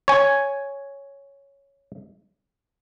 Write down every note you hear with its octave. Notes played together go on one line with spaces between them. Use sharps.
C#5 G#5